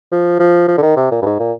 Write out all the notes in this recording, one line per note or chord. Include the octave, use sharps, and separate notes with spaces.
F3
F3
F3
D3
D#3
C3
A#2
G2
G#2
A#2